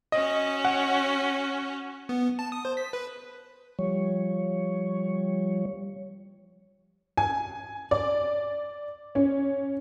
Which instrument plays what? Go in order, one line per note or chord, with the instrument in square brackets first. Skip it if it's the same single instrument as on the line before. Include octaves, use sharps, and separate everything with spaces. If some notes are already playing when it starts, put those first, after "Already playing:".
[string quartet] C#4 F#4 C#5 [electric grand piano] D#5
[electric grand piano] F#5
[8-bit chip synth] B3
A5
D#6
C5
B6
B4
[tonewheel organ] F3 G3 C#5
[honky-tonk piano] G#5
D5
C#4